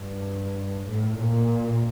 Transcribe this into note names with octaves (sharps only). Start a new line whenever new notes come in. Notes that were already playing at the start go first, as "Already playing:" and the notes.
Already playing: G2
A2
A#2